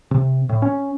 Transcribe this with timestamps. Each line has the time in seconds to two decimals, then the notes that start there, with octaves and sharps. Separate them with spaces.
0.11 C3
0.49 A2
0.62 C#4